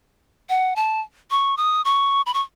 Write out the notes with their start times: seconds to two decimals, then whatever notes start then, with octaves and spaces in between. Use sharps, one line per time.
0.49 F#5
0.76 A5
1.31 C#6
1.57 D#6
1.85 C#6
2.26 B5
2.34 C#6